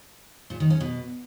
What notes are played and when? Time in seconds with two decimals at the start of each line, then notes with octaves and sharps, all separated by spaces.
0.50 A#2
0.60 D#3
0.70 C#4
0.81 B2